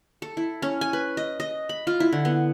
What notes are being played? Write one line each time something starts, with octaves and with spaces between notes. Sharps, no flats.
A4
E4
C#4
G#5
B4
D#5
D#5
B5
F4
E4
D3
B3